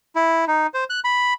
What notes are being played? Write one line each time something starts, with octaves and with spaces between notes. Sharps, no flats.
E4
D#4
C5
F#6
B5